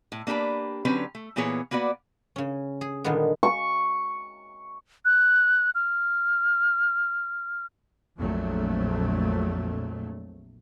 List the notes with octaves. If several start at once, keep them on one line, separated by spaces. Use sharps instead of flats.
A2
A#3 D4 G4 A4 B4
D3 F#3 C4 C#4 B4
A3
A#2 E3 A#3 B3 G#4 C#5
A#3 B3 F#4 B4 D5
C#3 C#4
G#4
A#2 D3 D#3 G3 G#3 B3
C#6
F#6
F6
A#1 F2 F#3 A3